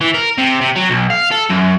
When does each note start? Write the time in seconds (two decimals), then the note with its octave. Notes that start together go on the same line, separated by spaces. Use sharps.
0.01 E3
0.14 A#4
0.38 C3
0.61 C3
0.76 F#3
0.90 B1
1.10 F5
1.31 A4
1.50 F#2